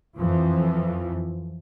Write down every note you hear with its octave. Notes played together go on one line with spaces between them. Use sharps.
F2 E3 F3